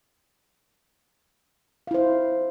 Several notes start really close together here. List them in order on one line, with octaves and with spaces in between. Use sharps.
F5 E4 C5